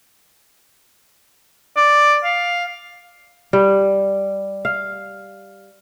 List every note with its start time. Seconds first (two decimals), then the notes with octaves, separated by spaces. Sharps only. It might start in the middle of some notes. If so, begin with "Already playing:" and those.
1.77 D5
2.24 F5
3.53 G3
4.65 F5